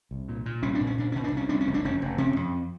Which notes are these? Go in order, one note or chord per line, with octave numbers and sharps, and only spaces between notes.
C2
A#2
A#2
C2 C#4
D4
A#2
C#4
A#2 D4
A#2 C#4
D4
C2
C#4
C2 D4
C#4
F1
D4
F1 C#4
F1
C3 C#4
F2